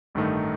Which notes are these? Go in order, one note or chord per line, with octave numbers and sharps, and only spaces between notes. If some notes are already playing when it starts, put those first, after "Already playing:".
A1 G2 D#3 A3 D#4